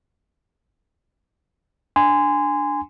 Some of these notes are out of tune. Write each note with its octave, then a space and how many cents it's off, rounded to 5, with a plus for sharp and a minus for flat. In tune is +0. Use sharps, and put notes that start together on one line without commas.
D4 +0 G#5 -10 C6 -25